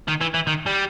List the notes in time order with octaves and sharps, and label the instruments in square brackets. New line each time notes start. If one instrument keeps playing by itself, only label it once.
[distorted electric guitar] D#3
E3
E3
D#3
G3